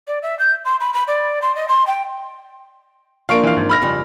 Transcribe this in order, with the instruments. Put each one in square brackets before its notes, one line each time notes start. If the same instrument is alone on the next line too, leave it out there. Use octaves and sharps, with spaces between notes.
[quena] D5
E5
G6
C6
B5
B5
D5
C6
D#5
C6
G5
[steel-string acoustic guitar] F3 A#3 D4 [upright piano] F5 C#6 D7
[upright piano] E3 F5
G#1
B5 F6 A#6
[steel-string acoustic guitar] F2 C#3 G3